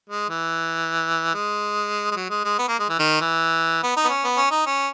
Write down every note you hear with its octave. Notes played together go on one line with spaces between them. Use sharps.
G#3
E3
G#3
G#3
F#3
G#3
G#3
B3
A#3
G#3
E3
D#3
E3
B3
D#4
B3
C#4
B3
C#4
D#4
C#4